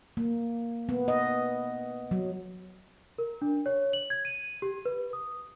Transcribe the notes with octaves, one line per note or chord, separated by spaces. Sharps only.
A#3
B3
D#5
F#3
A#4
D4
C#5
F#7
G#6
D#7
G4
B4
D#6